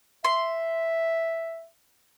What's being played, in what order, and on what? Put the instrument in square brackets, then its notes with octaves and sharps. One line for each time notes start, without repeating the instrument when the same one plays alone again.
[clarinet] E5 [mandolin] C6